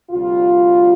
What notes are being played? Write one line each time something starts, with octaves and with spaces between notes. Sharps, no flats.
D2 C3 G3 F4